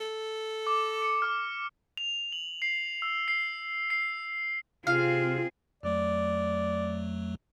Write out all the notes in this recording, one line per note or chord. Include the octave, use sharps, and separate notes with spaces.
A4
D6
C#7
D6 F6
F7
F#7
C7
E6
C7
C7
C3 C4 F4 G#4 F5
F2 F#3 A3 D5